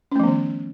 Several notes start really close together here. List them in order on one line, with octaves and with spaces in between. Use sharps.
C#4 A3 F3 B3 D#3